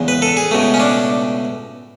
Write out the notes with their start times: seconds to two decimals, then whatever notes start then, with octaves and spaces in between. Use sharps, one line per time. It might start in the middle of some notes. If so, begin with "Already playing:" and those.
Already playing: E2 C#3 G#3 B3
0.08 B4
0.22 A4
0.37 G#4
0.51 C#2 B2 A3
0.74 C#4
0.80 D4